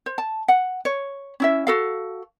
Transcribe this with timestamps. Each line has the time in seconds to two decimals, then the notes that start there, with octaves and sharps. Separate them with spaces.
0.06 C5
0.18 A5
0.48 F#5
0.85 C#5
1.40 C#4 E4 E5
1.67 F#4 A4 F5